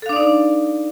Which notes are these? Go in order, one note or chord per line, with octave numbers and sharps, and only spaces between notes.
D4 D#4 A4 D5 F5